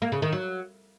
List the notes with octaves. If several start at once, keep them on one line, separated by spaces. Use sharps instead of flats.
A#3
C#3
D#3
F#3